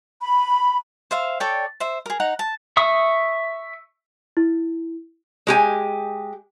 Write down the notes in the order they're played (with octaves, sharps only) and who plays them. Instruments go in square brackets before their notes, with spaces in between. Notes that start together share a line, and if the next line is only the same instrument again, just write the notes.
[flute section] B5
[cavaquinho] C5 E5 F5
A4 C#5 D5 G5
C5 E5
G#4 A#4
D#4 F#5 A#5
A5
[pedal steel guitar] E5 C#6 D#6
[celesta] E4
[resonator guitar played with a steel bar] G#3 G4 G#5